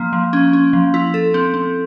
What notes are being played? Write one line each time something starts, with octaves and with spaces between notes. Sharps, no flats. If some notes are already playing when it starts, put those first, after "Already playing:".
Already playing: F3 A#3
F3
C#4
C#4
F3
E4
A4
C4
C4